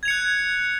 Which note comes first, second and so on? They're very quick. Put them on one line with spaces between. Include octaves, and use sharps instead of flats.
G#6 F7 C#7 F#6